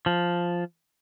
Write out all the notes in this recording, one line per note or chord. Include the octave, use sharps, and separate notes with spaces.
F3